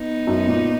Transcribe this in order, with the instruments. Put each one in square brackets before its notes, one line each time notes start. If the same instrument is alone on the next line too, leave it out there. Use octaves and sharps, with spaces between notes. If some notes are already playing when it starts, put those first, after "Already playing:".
Already playing: [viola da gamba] B3 D#4
[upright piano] F#2
A#2